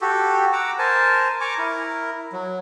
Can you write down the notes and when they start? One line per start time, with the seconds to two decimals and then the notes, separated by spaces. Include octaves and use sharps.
0.01 F#4 G4 A4
0.53 F#5 A#5 D6 E6
0.78 A#4 C5 G#5 A5
1.41 G#5 A#5 C#6 D6
1.58 E4 A#4
2.32 F#3